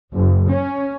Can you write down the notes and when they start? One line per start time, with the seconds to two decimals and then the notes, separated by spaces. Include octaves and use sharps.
0.14 F#1
0.50 C#4